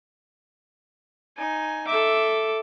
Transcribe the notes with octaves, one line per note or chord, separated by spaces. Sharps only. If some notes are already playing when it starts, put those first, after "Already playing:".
D#4 G#5
A4 E5 D6